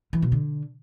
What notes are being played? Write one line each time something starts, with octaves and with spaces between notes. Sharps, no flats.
E3
B2
D3